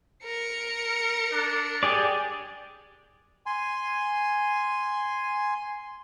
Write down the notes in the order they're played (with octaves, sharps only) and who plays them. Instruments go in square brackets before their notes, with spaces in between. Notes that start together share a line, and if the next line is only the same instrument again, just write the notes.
[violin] A#4 C#7
[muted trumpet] D4
[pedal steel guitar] G4 G#4 D5
[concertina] G#5 C6